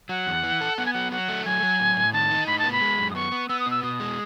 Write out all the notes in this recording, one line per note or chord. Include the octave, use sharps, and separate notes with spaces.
F#3 F#5
E2
E3
A4
B3 F#5
G#5
F#3 F#5
F#3 F#5
A3
F#3 G#5
F#3
A2
A2
D#3 A5
D#4
A2 B5
A5
B3
B5
G#3
F#2
D#6
B3 C#6
B3
B3 E6
D#6
B2 E6
B2 D#6
G#3